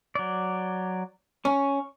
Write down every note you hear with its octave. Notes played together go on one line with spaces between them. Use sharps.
F#3 D5
C#4 C#6